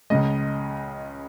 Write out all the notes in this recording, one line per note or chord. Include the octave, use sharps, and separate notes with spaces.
C#2 C#3 G#3 D#5